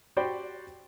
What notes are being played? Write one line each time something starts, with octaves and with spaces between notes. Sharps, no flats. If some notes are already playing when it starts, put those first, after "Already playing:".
F#4 G4 C5 D5 G5 B5